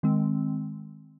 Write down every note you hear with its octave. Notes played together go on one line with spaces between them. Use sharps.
D#3 G#3 C4